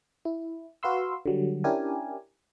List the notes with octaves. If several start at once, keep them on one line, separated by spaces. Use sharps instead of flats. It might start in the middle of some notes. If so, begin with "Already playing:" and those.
E4
F#4 B4 F5 C6 E6
D3 F#3 G3
C#4 D4 E4 G4 A#4 G#5